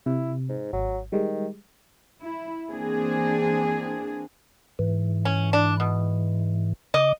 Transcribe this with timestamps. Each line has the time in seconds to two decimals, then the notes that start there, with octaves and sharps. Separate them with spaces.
0.06 C3 E4
0.49 G#2
0.73 G#1 F#3
1.12 D#3 G3 G#3
2.22 E4
2.69 E3 A#3 C4 D4 G#4
4.79 G#2 E3
5.25 C#4
5.53 D4
5.80 B2
6.94 C#3 D#5 D6